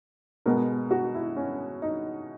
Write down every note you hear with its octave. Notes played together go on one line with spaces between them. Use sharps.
B2 G#3 B3 A#4
F#4
E4
C#4
D#4